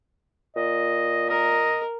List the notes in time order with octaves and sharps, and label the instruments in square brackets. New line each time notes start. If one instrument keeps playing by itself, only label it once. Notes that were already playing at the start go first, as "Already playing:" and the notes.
[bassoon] A#2 [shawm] D#5
[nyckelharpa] A#4 [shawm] D#5